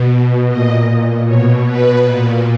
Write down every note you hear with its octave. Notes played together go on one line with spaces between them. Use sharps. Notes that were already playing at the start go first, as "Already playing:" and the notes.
Already playing: B2
A#2 D#5
B2 C#5
B4
A#2